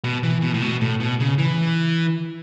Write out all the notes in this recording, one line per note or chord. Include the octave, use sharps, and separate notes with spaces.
B2
E3
B2
A2
B2
A2
B2
C#3
E3